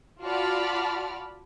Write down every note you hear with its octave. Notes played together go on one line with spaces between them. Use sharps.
F4 F#4 D5 A5 B5 F6